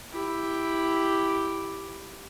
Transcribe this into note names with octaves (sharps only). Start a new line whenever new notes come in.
E4 G4